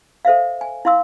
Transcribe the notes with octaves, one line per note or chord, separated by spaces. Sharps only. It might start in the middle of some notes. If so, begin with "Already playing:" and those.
A4 C5 E5 F5
G#5
E4 F5 C6 E6